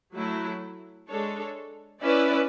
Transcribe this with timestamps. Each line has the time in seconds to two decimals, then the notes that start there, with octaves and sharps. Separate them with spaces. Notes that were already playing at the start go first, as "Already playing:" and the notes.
0.14 F#3 A3 E4
1.07 G#3 D4 A4 C#5
2.01 C#4 E4 B4 D5